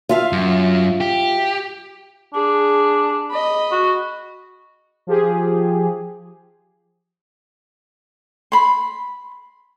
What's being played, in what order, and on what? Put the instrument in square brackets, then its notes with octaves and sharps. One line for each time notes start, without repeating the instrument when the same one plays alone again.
[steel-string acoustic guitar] F4 E5 F5
[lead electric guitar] F#2
G4
[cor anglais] D4 [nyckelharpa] G#4
[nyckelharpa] D#5 B5
[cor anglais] F#4
[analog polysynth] F3 G4 G#4
[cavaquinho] B5 C6